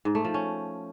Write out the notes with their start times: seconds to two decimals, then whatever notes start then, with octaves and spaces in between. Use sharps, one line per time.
0.05 G#2
0.15 A3
0.25 F3
0.34 C#4